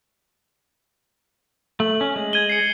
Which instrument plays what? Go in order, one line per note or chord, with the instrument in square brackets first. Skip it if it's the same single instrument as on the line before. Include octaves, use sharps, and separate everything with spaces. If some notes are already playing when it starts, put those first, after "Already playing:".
[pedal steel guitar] A3 [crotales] F#7
[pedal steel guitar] C#4
G#3
[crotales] G#6 D#7 G7
C7 C#7